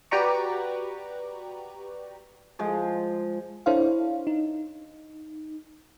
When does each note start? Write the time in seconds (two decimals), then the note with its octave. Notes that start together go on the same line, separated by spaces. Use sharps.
0.11 F#4 G4 B4 D5 A#5 C#6
2.59 F3 G#3
3.66 D4 E4 A4 C5 C#5 F5
4.27 D#4